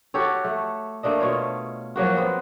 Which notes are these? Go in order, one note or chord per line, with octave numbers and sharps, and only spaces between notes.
F#4 G4 A4 C#5
A3
A3 A#3 D4 D#5
B2 F4 C#5
F3 F#3 A#3 F#4
B3 C4